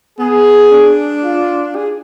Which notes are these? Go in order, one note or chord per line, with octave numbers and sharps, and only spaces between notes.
B3 G#4
D4
F4
G#4